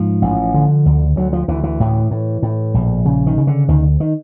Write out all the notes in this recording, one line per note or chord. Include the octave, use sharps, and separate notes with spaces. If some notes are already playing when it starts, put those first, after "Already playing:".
Already playing: G#2 F3
A1
D3
D2
D2 F#3
F3
D2 E3
E3
A2
A2
A2
A#1
C#3
D#3
C#3
D3
D2 D#3
D#3